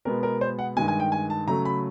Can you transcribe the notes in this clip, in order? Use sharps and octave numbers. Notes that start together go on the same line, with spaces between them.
B2 G#3 B3 A#4
A#4
C5
F#5
G2 D#3 G#3 G#5
G#5
G5
G#5
A5
C#3 F#3 A3 A#5
B5